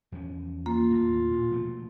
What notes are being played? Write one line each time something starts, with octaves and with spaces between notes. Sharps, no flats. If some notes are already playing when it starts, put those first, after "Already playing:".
E2 F3 C#4
A#3 F4
D#2 A2
A#2
B2 F3 A3